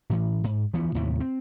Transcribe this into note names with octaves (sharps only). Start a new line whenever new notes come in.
A2 E3
G#2
D2 E3 F3 B3
D#2 A2 C3 E3
C4